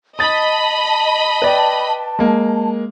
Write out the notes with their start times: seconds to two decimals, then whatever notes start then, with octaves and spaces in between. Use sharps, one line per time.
0.19 D#5 A5 B5 D#6 A6
1.42 B4 D5 G5
2.19 G#3 A#3